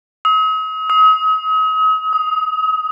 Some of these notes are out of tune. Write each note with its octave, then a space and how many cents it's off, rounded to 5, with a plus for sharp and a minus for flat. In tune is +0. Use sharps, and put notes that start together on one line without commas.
D#6 +45
D#6 +40
D#6 +15